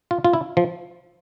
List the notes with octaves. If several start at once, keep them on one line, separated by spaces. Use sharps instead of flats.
F4
F4
E4
F3